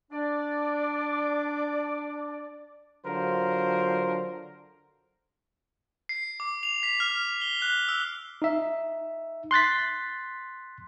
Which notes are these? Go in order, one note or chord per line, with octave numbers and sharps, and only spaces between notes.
D4 D5
D3 F#3 F4 A#4 C5
C7
D6
F7
B6
F6
G7
F#6
E6
D#4 E5
C6 F#6 A6 B6